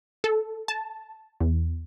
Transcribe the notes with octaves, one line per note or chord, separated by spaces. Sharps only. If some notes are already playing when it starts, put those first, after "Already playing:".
A4
A5
E2